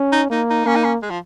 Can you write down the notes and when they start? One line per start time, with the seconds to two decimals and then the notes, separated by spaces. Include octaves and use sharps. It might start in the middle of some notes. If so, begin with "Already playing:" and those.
Already playing: C#4
0.12 D#4
0.30 A#3 D#4
0.50 D#4
0.66 A#3 C#4
0.76 D#4
0.84 C#4
1.02 G#3
1.10 F3